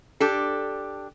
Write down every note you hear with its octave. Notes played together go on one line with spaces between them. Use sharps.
D4 G4 A4